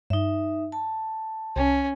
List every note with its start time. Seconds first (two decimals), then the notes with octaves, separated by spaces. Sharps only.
0.10 G2 D#4 E5
0.72 A5
1.56 C2 C#4